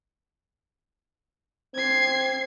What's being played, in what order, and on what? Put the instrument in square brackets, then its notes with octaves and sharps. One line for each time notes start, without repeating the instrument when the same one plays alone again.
[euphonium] C4 [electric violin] G#6 C7